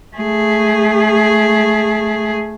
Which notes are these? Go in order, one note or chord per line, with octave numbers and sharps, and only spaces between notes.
A3 G#4